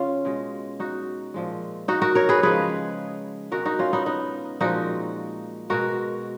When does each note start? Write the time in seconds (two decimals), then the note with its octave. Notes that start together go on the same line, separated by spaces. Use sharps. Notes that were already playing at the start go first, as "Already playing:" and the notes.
Already playing: C#3 C#4 F4
0.25 B2 G#3
0.80 D#4 F#4
1.34 A#2 F3 G#3
1.88 D#4 F#4
2.02 F#4 A#4
2.15 A#4 C#5
2.29 G#4 B4
2.43 C#3 F3 G#3 G#4 B4
3.51 B2 G#3 F#4 A#4
3.65 D#4 F#4
3.79 C#4 F4
3.93 B3 D#4
4.06 B3 D#4
4.60 A#2 F3 G#3 D#4 F#4
5.70 B2 G#3 F#4 A#4